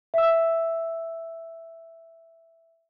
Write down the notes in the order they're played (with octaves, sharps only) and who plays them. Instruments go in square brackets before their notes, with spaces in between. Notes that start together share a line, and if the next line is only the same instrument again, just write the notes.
[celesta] E5 E6